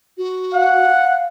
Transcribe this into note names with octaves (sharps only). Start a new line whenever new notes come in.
F#4
F5 F#5